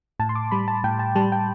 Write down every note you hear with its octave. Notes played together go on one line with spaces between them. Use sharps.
A2 A5
C6
D6
G3 B5
A5
A2 G5
A5
G3 A5
G5